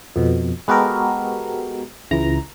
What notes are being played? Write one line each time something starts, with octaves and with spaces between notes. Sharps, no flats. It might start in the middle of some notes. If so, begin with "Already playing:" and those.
F2 B2
G#3 B3 F#4 G4 A4 A#4
C#2 E3 A#5